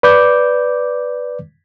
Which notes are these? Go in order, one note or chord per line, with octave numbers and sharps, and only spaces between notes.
B4 D5 D6 G6